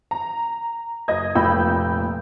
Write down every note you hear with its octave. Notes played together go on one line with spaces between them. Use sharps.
A#5
F#1 D#5 D#6 G#6
F1 A#2 G5 B5 E6 G6